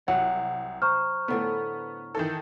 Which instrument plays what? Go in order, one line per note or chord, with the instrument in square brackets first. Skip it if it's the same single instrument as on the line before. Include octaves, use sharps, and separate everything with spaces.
[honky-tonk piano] C2 [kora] F#3 [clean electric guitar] F#5
[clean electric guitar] C5 [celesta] A#5 C#6 F6
[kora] A2 D3 A3 [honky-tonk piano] B3
[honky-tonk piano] D#3 E3 A4